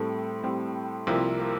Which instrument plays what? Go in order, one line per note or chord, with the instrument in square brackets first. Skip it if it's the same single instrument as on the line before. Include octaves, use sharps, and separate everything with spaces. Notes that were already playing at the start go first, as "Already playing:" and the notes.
Already playing: [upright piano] A2 G3 C4 [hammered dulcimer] A3
[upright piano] A2 G3 C4
[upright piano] C2 C3 F3 C4 E4 [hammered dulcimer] A#3
[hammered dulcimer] A#3